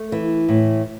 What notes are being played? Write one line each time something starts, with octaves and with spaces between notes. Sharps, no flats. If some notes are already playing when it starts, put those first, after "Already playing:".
Already playing: A3
E3
A2